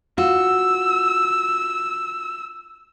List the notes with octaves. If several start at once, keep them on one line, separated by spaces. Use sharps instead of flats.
F4 F#4 E6